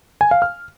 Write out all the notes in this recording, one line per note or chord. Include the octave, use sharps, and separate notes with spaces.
G#5
F5
F6